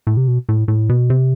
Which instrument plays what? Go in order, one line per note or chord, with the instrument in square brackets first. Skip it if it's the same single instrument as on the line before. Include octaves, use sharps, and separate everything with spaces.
[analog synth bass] A2
C3
B2
A2
A2
B2
C3